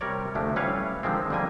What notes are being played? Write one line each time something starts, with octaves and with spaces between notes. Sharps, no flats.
C3 G3 A#4 C#5 D5
D2 C3 F3 A3 D4
G3 C#4 E4 B4 C#5 F5
D3 D#3 F3 G#3 C4
D3 G3 A#3 G#5